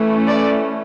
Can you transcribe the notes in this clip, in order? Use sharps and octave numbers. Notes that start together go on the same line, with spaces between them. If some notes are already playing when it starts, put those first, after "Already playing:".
Already playing: E3 A3 C#4
D5